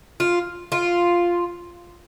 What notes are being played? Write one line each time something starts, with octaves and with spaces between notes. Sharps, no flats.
F4
F4